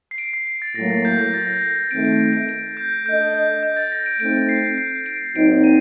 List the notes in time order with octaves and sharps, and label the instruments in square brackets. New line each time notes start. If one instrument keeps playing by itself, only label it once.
[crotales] C7
D7
C7
C7
A6
[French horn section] A2 F#3 A#3 [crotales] A#6
[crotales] A6
G6
A#6
A6
A#6
A#6
A#6
[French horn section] D#3 A3 C4 [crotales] D7
[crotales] D7
D7
D7
D7
G6
[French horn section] A3 D4 A4 D#5 [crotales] G6
[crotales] G6
G6
A6
A#6
D7
[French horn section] A3 C4 D#4 [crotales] D7
[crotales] C7
C7
D7
[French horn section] A#2 F#3 C4 D#4 [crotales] D7
[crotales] D#7